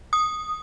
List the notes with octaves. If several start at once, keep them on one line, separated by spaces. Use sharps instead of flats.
D#6